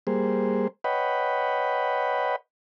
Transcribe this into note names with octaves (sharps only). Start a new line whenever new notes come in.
G3 A#3 G#4 C5
B4 C#5 D#5 F#5 G5 B5